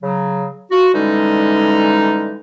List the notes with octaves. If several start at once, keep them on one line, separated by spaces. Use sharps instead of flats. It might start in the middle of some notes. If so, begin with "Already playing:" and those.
C#3 F#3
F4 F#4
D3 E3 G3 G#3 C#4 D#4